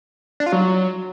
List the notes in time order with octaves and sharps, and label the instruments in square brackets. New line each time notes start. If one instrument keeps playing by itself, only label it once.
[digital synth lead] D4
F4
F#3